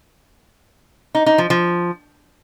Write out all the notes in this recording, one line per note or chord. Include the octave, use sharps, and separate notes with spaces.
D#4
D#4
F3
F3